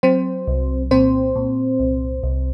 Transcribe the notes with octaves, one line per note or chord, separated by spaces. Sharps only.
F#3 C4 C5
C2
A#2 C4 C5
A#2
C2
C2